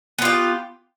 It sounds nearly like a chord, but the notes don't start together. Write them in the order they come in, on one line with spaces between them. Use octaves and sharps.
B3 F4 G4